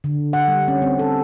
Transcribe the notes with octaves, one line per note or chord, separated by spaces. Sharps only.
D3
F#5
G3
C#4
C4
A4